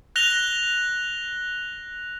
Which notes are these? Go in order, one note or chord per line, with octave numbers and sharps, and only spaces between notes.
F#6 A#6 F7 G7